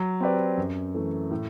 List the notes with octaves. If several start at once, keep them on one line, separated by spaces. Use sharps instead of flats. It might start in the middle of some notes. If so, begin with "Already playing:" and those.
Already playing: F#3
C4 G4 B4 D5
F#2
E3 A3
A2